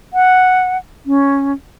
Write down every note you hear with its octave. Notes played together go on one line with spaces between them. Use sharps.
F#5
C#4